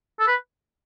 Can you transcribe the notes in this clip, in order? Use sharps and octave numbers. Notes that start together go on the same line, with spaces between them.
A4
B4